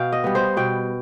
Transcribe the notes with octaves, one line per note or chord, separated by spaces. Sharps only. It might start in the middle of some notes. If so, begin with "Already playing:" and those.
Already playing: B2 F5 G5
D#5
G3 B3
C5
B2 G5